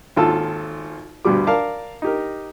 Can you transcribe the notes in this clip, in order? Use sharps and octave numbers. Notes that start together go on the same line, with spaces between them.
G#1 D#2 F4 A4 A5 E6
D2 G2 B2 G3 D6
A#4 D5 F5 A5 D6
D#4 G4 A#4